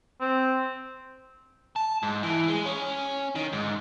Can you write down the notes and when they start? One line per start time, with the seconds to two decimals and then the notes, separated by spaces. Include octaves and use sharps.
0.21 C4
1.76 A5
2.03 G#2
2.23 E3
2.48 G#3
2.66 C#4
3.35 D#3
3.53 G#2